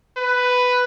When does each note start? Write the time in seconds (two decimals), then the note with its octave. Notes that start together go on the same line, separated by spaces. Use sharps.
0.17 B4